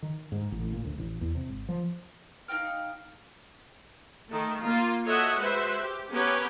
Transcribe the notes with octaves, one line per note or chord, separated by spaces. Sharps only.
D#3
G#2
A1
A#2
D2
A1
E2
C3
G#1
F3
D#4 F5 G5 F6
D#3 A3
A#3 F4
F#4 A4 C#5 D#5 E5 F#5
G#3 F#4 B4 C5 E5
G4
B3 C#4 G4 A#4 B4 C#5